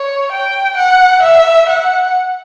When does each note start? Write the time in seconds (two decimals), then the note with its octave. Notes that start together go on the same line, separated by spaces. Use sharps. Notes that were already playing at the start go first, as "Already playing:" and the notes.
Already playing: C#5
0.32 G5
0.77 F#5
1.23 E5
1.69 F#5